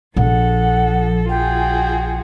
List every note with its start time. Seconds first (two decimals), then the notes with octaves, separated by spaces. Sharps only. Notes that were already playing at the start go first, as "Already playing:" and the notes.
0.16 A#1 F3 A4 F#5
1.29 F4 F#4 G#4 G5